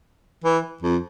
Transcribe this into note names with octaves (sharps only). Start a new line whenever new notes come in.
E3
F2